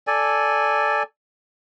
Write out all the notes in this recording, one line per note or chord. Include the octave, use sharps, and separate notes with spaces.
A4 D5 G#5